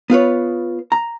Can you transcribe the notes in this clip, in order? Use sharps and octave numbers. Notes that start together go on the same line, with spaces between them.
B3 F4 B4 C#5
A#5